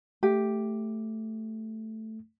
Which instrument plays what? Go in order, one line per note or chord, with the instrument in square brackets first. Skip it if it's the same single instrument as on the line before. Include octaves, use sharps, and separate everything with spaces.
[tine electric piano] A3 [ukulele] G4